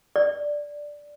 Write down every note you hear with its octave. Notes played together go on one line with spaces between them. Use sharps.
D5